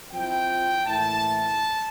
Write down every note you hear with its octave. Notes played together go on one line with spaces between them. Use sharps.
F3 C4 E4 G5
A2 E3 A#3 E4 A5